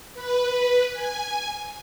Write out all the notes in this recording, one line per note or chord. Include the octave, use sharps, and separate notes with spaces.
B4
G#5